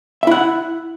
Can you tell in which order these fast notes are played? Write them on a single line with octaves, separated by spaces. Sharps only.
E5 E4 F#5